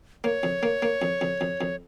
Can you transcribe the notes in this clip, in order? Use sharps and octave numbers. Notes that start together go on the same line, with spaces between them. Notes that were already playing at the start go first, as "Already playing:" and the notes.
A#3 C#5
F2
A#3
A#3
F2
F2
F2
F2